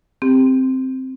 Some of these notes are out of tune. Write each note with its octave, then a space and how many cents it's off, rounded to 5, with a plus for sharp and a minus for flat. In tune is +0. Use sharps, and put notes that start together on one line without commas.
C4 +0 G4 +15